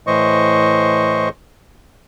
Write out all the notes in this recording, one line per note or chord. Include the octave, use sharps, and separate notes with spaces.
A2 E3 C5 D#5 C#6